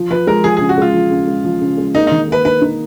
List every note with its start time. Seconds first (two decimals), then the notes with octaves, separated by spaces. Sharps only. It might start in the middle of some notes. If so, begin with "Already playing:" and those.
Already playing: F3
0.11 F3 B4
0.27 G#3 A#4
0.44 F3 G#4
0.57 C#3 G#4
0.69 F#4
0.78 G#3 F4
0.94 F3
1.11 C#3
1.27 G#3
1.44 F3
1.61 C#3
1.77 G#3
1.94 A#3 D#4
2.07 D#3 D#4
2.28 A#3 B4
2.45 D#4 B4
2.62 D#4